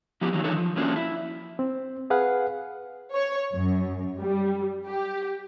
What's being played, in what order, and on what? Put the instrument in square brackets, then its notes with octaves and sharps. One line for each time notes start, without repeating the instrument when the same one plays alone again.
[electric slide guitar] F3 B3 E4 F#4 G4
D#3 E3 F#3 G3
E2 D3 F3 D#4 A4 C#5
F3
F3 A#3 C#4 D4 F#4
E4
[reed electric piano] C4
G#4 B4 F5 F#5
[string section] C#5
F#2
G3
G4